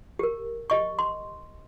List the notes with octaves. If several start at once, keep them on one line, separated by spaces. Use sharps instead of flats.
G4 A#4
G4 D#5 C#6
C6